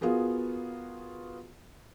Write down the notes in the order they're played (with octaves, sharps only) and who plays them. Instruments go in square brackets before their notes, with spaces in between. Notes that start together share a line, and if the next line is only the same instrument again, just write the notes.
[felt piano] B3 F4 F#4 G#4 A#4